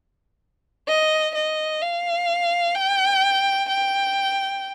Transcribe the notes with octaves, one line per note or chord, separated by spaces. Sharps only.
D#5
D#5
F5
G5
G5